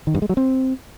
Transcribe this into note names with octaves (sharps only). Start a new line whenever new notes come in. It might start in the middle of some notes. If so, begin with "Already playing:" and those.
D#3
G2
G#3
F#3
C4